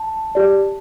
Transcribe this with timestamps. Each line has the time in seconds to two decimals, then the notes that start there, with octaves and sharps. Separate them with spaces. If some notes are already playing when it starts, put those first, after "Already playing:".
Already playing: A5
0.35 G4 D5